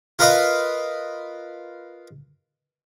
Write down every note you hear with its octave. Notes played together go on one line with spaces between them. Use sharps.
F4 A#4 B4 D#5 F5